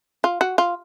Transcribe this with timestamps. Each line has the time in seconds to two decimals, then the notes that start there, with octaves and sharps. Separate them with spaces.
0.24 F4
0.41 F#4
0.58 F4